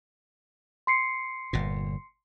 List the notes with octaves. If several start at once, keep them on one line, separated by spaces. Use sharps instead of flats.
C6 C7 C#7
G1 A#2